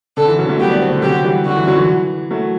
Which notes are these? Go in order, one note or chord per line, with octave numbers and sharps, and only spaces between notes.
D3 A4
E3
D3 F#3
F#3 A3
G3 B3 G4
B3 D4
A3 C4
D3
D3 F#3 G4
E3 G3
D3 F#4
E3
D3 F#3
E3
F#3 A3